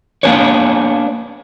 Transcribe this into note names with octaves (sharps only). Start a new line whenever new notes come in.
A#3 B3 D4 G#4 B4 C#5